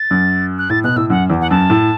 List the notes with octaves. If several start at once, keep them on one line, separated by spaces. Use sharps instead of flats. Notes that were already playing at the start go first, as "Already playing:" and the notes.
Already playing: A6
F#2
F#6
A2 A6
B2 F#6
A2 E6
F#2 F#5
E2
F#5
F#2 A5
A2